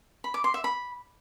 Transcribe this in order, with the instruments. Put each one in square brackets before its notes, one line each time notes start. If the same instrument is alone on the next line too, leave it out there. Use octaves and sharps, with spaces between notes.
[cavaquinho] B5
D6
C6
E5
B5